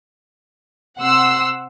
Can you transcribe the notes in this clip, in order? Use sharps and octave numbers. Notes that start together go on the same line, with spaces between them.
C3 F#5 C6 E6 C7